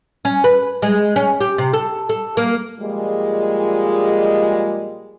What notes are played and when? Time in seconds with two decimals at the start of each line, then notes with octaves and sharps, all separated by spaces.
0.25 C#4
0.44 B4
0.82 G#3
1.16 C#4
1.41 G4
1.58 C3
1.73 A4
2.09 A4
2.37 A#3
2.79 A#2 F3 G3 G#3